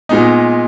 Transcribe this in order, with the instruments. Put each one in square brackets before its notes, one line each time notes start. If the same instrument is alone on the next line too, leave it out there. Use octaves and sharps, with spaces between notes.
[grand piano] A#2 G#3 B3 D#4